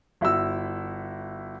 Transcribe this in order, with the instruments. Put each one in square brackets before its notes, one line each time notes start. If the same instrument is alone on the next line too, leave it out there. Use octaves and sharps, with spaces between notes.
[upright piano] G1 E4 F#4 E6